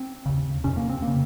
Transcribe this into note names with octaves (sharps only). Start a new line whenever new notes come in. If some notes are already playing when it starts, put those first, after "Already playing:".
Already playing: C4
D#2 C#3
F2 C3 C#4
A#3
C4
C#3 A#3